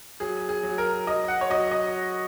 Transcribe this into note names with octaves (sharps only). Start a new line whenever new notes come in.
F#3 G#4
G#4
F#3
A#4
F#3 D#5
F#5
C#5
F#3 D#5
D#5